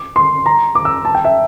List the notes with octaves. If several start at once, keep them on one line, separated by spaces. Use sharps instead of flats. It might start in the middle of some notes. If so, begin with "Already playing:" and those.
Already playing: D6
C6
A#5
D6
E6
A5
G5
E5